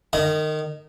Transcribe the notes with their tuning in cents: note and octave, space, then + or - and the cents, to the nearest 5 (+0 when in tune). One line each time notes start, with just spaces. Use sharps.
D#3 -25 D#5 +0